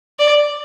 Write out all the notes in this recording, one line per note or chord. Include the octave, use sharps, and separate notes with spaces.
D5